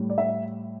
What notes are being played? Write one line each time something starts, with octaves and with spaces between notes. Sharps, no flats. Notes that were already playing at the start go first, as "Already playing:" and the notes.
Already playing: A2 G3
D5
E5